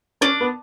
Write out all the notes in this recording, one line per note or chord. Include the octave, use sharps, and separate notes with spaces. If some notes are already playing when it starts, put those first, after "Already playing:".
C#4 D4
B3